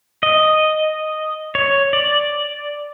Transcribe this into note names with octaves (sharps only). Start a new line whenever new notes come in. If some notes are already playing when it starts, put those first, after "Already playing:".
D#5
C#5
D5